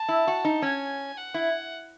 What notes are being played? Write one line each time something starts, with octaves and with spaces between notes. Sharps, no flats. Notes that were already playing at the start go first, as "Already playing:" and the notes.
Already playing: A5
E4
F#4
D#4
C#4 G#5
F#5
E4